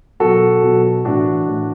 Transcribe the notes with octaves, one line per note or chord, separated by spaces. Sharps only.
B2 F#3 F#4 A4
B2 F#3
A2 E3 D4 F#4
A2 E3